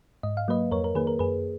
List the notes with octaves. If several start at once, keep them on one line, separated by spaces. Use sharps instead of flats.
G#2 D#5
F5
F#3 A#3 B4 D#5
F2 A#4 C#5
A#4
D#3 A#3 G#4 B4
A#4
F#2 G#4 B4